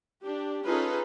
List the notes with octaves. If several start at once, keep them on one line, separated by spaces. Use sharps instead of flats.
D4 G4
C#4 D#4 F4 G#4 A4 B4